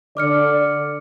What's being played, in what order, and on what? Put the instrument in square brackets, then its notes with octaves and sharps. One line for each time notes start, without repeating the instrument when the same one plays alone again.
[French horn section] D3 D5 [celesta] D6 F6 C#7